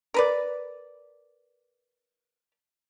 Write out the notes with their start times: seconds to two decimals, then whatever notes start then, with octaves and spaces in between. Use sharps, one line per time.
0.14 A#4 B4 D5